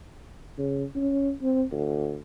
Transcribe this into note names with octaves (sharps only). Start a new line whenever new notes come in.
C#3
C#4
C4
D2